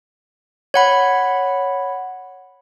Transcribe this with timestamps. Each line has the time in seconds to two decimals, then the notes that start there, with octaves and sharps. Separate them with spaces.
0.74 C#5 F#5 B5